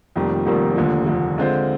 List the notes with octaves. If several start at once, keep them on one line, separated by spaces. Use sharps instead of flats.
F1 F2 D#3 G3 A#3
F1 F2 D#3 G3 A#3
F1 D#2 D3 F3
F1 D#2 D3 F3
D3 G#3 C4 F4 C5